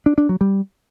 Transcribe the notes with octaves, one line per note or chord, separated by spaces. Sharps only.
D4
D4
F#3
G3